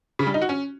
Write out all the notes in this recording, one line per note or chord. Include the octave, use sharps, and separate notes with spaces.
C#3
G3
D#4
F#4
C#4